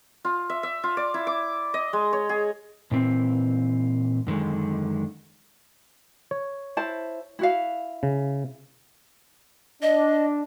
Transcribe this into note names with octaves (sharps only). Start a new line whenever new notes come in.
F4
E5
E5
F4
D5
E4
D6
D#5
G#3
C#5
G#4
A#2 E3 C4
F#2 D3 D#3 G#3
C#5
E4 C5 A5
E4 F#4 F5
C#3
D4 D#5